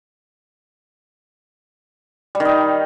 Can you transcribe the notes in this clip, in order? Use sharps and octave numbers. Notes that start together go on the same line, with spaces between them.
G3
D#3
D#4